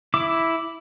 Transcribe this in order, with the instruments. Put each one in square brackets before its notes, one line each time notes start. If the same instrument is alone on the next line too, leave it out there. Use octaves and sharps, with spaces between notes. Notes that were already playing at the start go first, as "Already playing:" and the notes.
[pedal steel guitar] E4 D6